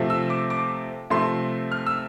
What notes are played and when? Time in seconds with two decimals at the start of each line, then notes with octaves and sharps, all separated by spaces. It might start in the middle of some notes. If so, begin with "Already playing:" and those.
Already playing: C3 F3 A3
0.10 E6
0.30 D6
0.50 D6
1.10 C3 F3 A3 C6
1.72 F6
1.86 E6